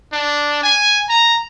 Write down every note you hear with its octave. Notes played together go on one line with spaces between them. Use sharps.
D4
G#5
A#5